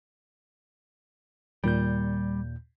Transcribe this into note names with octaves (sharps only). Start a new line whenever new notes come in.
D#2 A#2 G3 G6